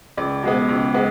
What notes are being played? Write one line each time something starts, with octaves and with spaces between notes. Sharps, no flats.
C#2 D5
B2 G#3 B3
C#2
G#3 B3